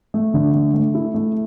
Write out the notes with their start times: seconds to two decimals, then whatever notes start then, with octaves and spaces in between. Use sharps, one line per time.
0.14 A3
0.34 D3
0.54 A3
0.74 A3
0.95 E4
1.14 A3